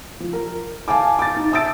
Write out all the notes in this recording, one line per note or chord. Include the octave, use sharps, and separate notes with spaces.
F3
A#4
F5 G#5 A5 D6
D6 A6
D#4
E5 A5 D#6 E6 A6 D7